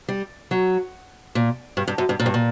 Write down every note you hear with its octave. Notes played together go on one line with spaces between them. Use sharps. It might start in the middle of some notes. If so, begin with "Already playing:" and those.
G3
F#3
A#2
G2
G2
F#2
G2
A#2
G2
A#2